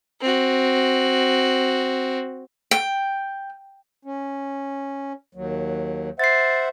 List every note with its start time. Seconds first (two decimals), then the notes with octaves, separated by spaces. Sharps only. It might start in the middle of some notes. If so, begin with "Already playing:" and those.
0.21 C4 F#4
2.71 G5
4.05 C#4
5.35 D#2 F#3
6.19 C5 E5 F#5 A6 C7